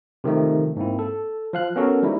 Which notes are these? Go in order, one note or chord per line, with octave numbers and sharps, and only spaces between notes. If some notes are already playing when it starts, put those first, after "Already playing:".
C3 D#3 F3 A3 D#4
G#2 A#3 C4 E4
A4
F3 F5 F#6
B3 C#4 F#4 A4 A#4
F3 G3 G#3 D#4 E4